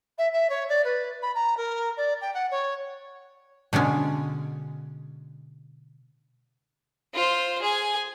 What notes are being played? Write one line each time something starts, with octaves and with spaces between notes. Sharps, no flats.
E5
E5
C#5
D5
B4
B5
A#5
A#4
D5
G5
F#5
C#5
B2 D3 G#3 C#4
F4 C5
G#4 G#5